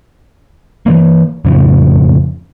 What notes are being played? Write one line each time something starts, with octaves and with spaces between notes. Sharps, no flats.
E3 F3 A#3
F2 A2 C#3 F3